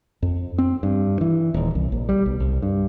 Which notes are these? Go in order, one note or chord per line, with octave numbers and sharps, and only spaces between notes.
F2
C4
G2
E3
D#1
C2
A#1
G3
B1
C2
G2